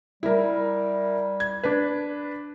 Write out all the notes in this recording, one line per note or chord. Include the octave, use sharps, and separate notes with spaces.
G3 E4 A#4
G#6
D4 B4